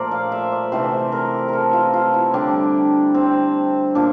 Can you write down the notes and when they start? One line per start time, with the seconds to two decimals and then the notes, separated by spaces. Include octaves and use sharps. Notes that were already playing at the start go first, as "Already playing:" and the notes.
Already playing: A#2 F3 A3 A#4 C5 D5
0.11 F5
0.32 E5
0.52 D5
0.72 C3 E3 A3 C5
1.12 A#4
1.48 A4 A#4
1.73 F4
1.93 F4
2.14 E4
2.34 D3 G3 D4
3.14 C4
3.95 A#2 D4